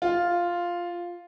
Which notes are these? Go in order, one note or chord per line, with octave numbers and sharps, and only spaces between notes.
F4